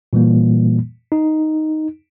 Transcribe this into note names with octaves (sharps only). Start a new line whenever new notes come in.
A#2 E3 G3 A#3
D#4